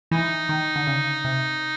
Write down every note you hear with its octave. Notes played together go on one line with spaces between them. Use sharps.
E3 D#4
D#3
D3
C#3
C3